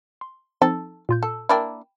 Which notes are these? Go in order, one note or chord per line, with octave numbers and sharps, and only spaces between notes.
C6
F3 C4 D#4 A4
A#2 F4 G6
A4
A#3 D4 E4 G5 B5